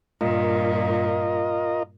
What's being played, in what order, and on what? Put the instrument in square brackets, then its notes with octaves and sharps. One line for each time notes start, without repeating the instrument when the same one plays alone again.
[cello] G2 A#2 [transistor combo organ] F4 A#4 D#5